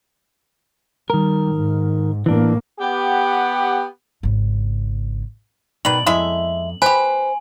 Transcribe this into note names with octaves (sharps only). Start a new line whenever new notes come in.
D#3 G3 A#4
G#2
A2 E3 A#3 D4
B3 G4 F#5
G#1 C#3
B2 D#3 B4 D5 F#7
F2 G#3 E4 E5
G4 B4 C5 G#5